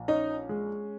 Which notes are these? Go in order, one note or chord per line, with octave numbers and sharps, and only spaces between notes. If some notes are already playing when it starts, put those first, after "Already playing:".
Already playing: A#1
C#4 D#4
G#3